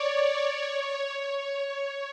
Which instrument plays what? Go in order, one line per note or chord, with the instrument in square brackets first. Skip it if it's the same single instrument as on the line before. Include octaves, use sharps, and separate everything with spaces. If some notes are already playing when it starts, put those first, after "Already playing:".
Already playing: [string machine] C#5 D5
C#5
C#5